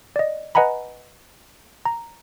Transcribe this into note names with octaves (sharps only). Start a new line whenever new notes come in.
D5 D#5
B4 D#5 F#5 G#5 A#5 B5
A#5